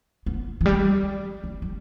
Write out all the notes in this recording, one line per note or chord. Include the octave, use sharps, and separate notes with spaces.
B3
E3
G3
G3
G3